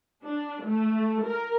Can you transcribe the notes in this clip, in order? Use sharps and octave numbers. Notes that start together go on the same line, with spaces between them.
D4
A3
A#4